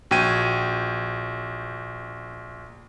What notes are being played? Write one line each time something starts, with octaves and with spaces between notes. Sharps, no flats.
A#1 F#4 G5 G#6 D#7